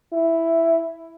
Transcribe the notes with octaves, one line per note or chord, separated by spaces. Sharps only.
E4